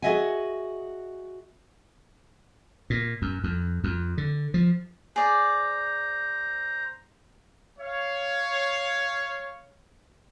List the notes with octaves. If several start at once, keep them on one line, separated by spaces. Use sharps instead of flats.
F#4 G#4 D#5 E5 F#5 G#5
A#2
F#2
F2
F2
D3
F3
G#4 C5 D5 A#5
C#5 F5